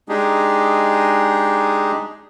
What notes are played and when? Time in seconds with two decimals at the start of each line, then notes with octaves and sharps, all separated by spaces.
0.09 G#3 D4 D#4 G4 G#4